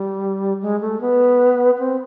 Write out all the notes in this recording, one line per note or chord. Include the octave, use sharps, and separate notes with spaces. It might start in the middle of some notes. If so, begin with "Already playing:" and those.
Already playing: G3
G#3
A3
B3
C4